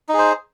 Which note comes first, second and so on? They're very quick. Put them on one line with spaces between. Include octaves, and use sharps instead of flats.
D#4 G#4 C5